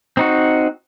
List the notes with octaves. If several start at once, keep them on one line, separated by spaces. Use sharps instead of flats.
C4 D#4 F#4